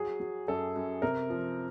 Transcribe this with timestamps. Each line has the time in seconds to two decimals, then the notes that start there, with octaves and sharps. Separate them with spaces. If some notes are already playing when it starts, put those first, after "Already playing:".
Already playing: F#3 G#4
0.20 F#3
0.48 F#2 A4
0.76 F#2
1.02 C3 A#4
1.30 F3